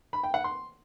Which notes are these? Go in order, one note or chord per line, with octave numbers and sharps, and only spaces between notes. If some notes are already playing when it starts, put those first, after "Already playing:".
B5
G5
F#5
C6